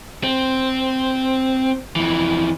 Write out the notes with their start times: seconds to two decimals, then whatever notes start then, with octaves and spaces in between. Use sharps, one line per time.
0.24 C4
1.96 F2 E3